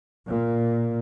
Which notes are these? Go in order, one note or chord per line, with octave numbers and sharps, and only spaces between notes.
A#2